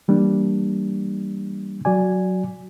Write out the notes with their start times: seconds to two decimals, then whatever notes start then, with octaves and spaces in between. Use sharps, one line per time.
0.08 E3 G3 A#3 D4
1.85 F#3 F#4 D5 G#5